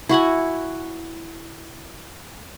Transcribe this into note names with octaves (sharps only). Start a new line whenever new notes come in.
E4 F#4 F#5 G#5